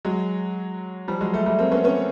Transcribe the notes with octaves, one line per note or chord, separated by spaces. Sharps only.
F#3 G#3
F3 G3
F#3 G#3
G3 A3
G3 A3
A#3 C4
B3 C#4
B3 C#4